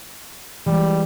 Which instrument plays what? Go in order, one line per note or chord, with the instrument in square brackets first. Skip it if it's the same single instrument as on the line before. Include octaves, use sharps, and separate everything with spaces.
[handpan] E3 G#3 [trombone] G3